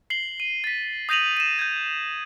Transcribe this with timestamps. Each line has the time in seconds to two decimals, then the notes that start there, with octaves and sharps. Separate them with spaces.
0.10 C7 F#7 G7
0.40 D#7
0.64 A6 B6
1.09 D#6 G6 A#6 D#7 F7 F#7
1.37 D#7 E7
1.59 G6 G#6